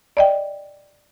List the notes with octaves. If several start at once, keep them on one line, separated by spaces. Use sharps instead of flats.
D5 D#5 G5